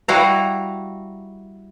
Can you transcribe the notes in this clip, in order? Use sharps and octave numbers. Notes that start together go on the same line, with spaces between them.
G3 E4 F#4 F5 A#5